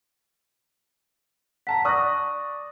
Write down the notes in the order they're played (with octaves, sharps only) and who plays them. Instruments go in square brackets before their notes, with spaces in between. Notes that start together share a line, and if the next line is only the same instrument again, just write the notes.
[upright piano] F#5 A5 A#5 [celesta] B6
[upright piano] D5 D#6 F#6 [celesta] C#6 A#6